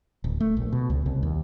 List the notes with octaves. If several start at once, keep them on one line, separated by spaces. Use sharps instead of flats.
D1
A3
A#1
B2
C#2
C2
D#2